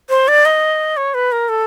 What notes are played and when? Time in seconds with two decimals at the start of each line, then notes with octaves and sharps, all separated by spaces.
0.09 C5
0.28 D5
0.45 D#5
0.97 C#5
1.14 B4
1.32 A#4
1.49 A4